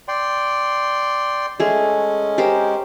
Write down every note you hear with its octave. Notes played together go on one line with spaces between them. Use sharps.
D5 G5 C6
G#3 A3 C#4 G#4
G4 A#4 C5